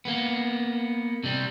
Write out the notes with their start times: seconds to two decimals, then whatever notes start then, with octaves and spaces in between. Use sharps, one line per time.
0.05 A#3 B3
1.24 C3 G3